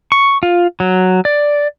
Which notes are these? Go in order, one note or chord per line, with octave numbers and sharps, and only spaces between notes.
C#6
F4
F#3
D5